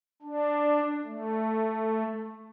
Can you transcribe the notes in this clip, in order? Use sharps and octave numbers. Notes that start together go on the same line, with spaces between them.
D4
A3